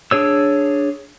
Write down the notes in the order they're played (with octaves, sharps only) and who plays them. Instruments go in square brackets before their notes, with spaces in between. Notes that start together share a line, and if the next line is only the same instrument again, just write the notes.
[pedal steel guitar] D4 G#4 C#5 E6